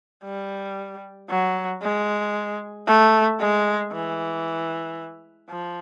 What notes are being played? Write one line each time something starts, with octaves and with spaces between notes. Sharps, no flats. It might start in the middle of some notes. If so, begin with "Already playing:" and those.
G3
F#3
G#3
A3
G#3
E3
F3